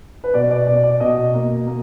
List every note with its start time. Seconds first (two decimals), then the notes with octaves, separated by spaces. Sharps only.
0.24 B4
0.34 B2 D5
0.51 D5
0.67 B2 D5
0.84 D5
1.00 B2 D#5
1.34 A#3
1.67 A#3